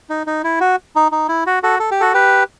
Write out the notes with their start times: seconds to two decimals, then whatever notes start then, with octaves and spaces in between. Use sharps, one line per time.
0.10 D#4
0.27 D#4
0.44 E4
0.60 F#4
0.96 D#4
1.12 D#4
1.28 E4
1.46 F#4
1.63 F#4 A4
1.79 A4
1.91 G4
2.00 F#4 A4
2.13 G4 B4